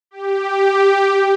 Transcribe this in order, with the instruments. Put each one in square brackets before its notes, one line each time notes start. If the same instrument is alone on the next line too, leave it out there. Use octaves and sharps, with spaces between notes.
[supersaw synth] G4